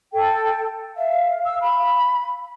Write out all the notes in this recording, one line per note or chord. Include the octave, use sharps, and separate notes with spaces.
A4 G5
E5 F5
E6
B5